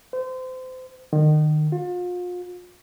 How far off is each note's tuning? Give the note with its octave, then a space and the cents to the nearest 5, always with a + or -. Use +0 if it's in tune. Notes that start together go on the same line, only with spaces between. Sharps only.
C5 -30
D#3 -30
F4 +35